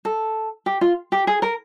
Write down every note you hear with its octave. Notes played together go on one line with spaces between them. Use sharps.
A4
G4
F4
G4
G#4
A#4